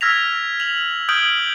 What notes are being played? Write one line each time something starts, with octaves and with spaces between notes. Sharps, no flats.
E6 F6 G#6 A#6 B6 F7
F7 F#7
D#6 F6 G6 G#6 D7 F#7